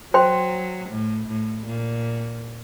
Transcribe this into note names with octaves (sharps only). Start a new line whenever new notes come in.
F#3 C5 G5 C6
A2
A2
A#2